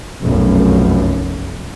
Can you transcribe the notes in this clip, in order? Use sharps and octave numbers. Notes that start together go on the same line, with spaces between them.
F1 B1 F#2